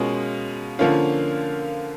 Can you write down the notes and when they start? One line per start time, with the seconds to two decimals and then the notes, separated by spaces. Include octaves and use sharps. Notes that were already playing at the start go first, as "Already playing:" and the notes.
Already playing: B2 G#3 C#4 F4 A#4
0.79 D3 F3 A#3 C#4 F4